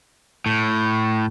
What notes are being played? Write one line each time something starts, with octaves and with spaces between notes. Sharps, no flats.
A2